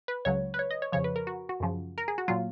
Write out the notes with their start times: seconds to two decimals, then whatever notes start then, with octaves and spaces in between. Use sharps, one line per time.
0.08 B4
0.25 C#2 C#3 F#3 C#5
0.54 B4
0.59 C#5
0.71 D#5
0.82 C#5
0.92 F2 C#3 F3 C#5
1.04 B4
1.16 A#4
1.27 F#4
1.49 F#4
1.60 F#2 C#3 F3
1.98 A#4
2.08 G#4
2.18 F#4
2.28 A#2 F#3 F4